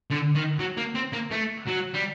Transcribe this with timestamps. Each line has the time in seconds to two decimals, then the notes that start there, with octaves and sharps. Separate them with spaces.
0.11 D3
0.35 D#3
0.59 F#3
0.77 A#3
0.95 C4
1.13 A#3
1.32 A3
1.67 F#3
1.94 G3